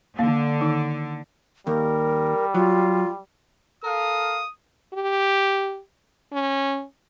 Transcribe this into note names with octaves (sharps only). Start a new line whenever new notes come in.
D3 A#3 F5
D#3 D#4
D#2 G3 A#4
F#3 F4
A4 A#4 F5 D#6
G4
C#4